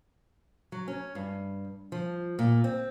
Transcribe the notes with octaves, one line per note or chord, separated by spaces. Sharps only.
F#3
C#4
G2
F3
A#2
C4